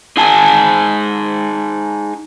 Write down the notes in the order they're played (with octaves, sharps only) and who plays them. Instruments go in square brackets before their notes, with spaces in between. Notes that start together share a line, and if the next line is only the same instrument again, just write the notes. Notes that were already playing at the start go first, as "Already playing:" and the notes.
[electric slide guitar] D#4 G#4 G#5 A5